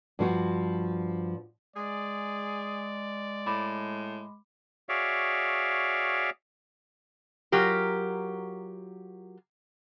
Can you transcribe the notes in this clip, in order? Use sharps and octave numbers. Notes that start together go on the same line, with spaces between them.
G2 F3 F#4
G#3 G#4 D5
A2 B5 D6
F#4 G#4 C#5 D5 E5 F5
F#3 F4 G4 A#4